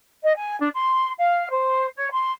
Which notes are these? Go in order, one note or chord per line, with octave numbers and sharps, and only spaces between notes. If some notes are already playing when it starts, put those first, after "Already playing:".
D#5
G#5
D4
C6
F5
C5
C#5
C6